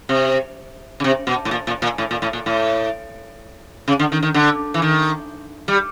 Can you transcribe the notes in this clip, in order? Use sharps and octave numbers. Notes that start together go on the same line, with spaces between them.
C3
C#3
C3
B2
A2
A#2
A#2
A#2
A2
A#2
A2
A#2
A2
C#3
D3
D#3
D#3
D3
E3
D#3
G3